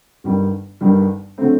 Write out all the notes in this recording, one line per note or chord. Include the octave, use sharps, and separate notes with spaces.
G1 G2 D#3 G3
G1 G2 D#3 G3
D3 F#3 A3 C4